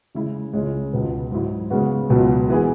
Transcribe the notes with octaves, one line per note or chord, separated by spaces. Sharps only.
C#3 G#3 E4
C#2 C#3 G#3 C#4
C#2 B2 B3
G#2 F#3 E4
C#3 G#3 B3 F#4
C#2 B2 F#3
E3 B3 E4 G#4